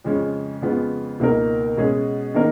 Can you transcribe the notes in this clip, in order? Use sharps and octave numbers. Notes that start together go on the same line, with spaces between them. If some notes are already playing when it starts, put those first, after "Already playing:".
F2 C#3 G#3 C#4 F4
F2 C#3 G#3 B3 F4
C#2 B2 A#3 D#4 A#4
B2 G#3 C#4 G#4
D#3 A#3 D#4 A#4